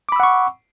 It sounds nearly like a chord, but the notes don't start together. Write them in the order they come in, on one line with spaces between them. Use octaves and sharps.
D6 B5 E6 F#5 C#6